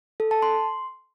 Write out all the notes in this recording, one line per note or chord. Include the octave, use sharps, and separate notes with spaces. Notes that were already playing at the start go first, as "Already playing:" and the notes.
A4
A5
C6